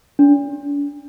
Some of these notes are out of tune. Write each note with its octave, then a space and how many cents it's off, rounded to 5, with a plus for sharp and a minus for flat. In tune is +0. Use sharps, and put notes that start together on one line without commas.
D4 -40